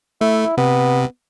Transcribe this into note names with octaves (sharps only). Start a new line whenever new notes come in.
A3 E4
C3 B3